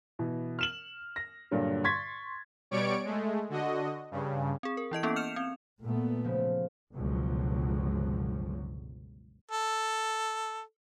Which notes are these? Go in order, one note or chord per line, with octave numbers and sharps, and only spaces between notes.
B2 E3
F6 E7 F#7
A#6
G2 A#2 D3 F#3
C6 C#6 G#6 A6 B6
B2 G3 C#5 D5 C#6 D7
G#3 A3
D3 F#4 D#5
G2 C#3
C4 G#4
A#4
E3 E4 D#5 D7
A#3 B3 C#4 E4 A4
F6 G6 C#7 E7 F7
C4
A#2 A3 B3
C#3 F3
G1 C#2 B2 F3 F#3
A4